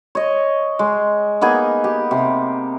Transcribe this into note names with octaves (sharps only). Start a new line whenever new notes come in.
C#5 D#5
G#3
A#3 B3 D#4 G#4
G4
C3